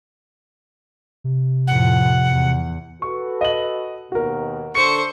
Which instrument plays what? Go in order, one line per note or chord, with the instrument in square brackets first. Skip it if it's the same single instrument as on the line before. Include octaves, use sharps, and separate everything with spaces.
[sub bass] C3
[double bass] F2 A2 [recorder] F#5
[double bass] E2
[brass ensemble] F#4 A4 B4 [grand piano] C#6
[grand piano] D#5 F#7
[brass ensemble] D#2 B2 [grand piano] F#4 A#4
[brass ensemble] D3 A4 [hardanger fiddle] C5 C#6 [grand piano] C#7